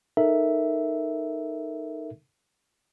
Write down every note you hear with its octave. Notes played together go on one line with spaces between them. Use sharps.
D#4 A4 A#4 E5